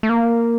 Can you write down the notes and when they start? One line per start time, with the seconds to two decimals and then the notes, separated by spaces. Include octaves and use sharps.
0.03 A3
0.09 A#3